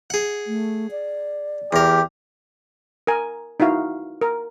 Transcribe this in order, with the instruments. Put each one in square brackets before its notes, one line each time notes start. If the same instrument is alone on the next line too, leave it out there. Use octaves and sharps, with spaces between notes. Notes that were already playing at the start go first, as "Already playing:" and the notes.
[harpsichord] G#4 F#5
[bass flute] A3
D5
[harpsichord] E2 A#4 [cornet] G4
[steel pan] A#4 G#5
D#4 E4 F#4 F5
A#4